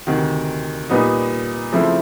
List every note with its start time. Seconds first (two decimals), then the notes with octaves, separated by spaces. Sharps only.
0.07 D2 C3 D#3
0.90 A#2 G3 B3 D#4
1.72 C#3 F3 A3 C4 E4